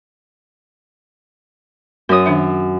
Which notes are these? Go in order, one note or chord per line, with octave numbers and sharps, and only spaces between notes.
F#2 A#4 C#5 D#6
D#3 D4 E5